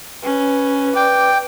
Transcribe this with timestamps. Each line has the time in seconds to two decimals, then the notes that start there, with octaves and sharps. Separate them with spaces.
0.23 C#4 B4
0.96 D5 G5